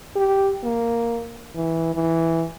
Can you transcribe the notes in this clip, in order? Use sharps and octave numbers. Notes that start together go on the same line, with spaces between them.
G4
A#3
E3
E3